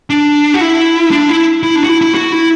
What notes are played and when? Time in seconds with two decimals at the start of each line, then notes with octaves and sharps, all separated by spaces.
0.10 D4
0.54 F#4
0.61 E4
1.11 D4
1.29 E4
1.63 E4
1.76 D4
1.84 F#4
1.89 E4
2.01 E4
2.14 F#4
2.32 E4